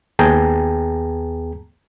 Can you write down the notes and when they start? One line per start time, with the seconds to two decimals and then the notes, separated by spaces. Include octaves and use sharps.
0.19 D#2 B3 G#4 G5 A5 A#5